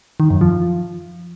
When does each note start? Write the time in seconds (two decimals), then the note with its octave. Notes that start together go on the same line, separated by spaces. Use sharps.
0.20 D#3
0.30 F#2
0.41 F3